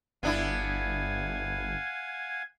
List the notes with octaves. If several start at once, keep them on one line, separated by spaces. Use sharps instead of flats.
G1 B3 D4 E4 F5 F#5 G#5 G#6